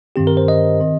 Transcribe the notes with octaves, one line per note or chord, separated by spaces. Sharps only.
G2 D#3 C4 G4
A#4
C5
D#5
D#3 C4